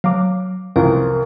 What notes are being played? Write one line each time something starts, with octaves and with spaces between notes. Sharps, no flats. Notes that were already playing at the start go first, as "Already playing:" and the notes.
F#3 F5 D6
C2 F2 E3 A#4